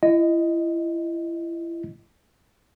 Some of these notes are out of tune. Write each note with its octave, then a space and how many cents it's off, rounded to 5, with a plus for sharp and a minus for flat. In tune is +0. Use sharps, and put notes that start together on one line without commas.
E4 +30 D#5 +0